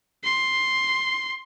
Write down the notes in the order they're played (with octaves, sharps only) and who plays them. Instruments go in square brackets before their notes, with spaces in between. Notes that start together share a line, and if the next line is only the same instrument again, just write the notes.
[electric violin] C6